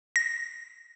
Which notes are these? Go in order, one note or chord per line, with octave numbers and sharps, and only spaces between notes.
A#6